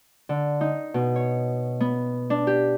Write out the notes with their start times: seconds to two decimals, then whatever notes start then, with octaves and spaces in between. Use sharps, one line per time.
0.29 D3
0.61 D#4
0.94 B2
1.16 C#5
1.81 B3
2.30 D4
2.47 G4